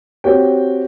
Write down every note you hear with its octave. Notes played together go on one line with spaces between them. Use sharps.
C4 F#4 G4 C#5 G5